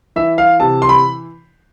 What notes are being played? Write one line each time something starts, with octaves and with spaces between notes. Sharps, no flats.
E3 E5
F5
C3 A5
C6
B5